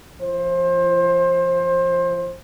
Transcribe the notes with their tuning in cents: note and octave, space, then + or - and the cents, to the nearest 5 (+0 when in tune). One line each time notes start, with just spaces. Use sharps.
F3 -30 C5 +25